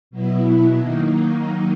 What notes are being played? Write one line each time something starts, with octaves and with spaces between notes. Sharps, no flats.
B2 F#3 B3 E4
D#3 F#3 A#3 D#4